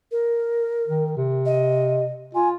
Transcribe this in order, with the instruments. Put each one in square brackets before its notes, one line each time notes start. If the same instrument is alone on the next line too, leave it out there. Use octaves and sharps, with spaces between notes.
[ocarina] A#4
[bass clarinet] D#3
C3
[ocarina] D#5
[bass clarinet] F4 [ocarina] G#5